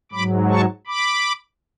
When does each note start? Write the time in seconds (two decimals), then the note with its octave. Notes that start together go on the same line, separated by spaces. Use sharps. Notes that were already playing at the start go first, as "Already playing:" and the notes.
0.12 G#2 F#3 B5 D6
0.50 A5 C#6
0.87 B5 D6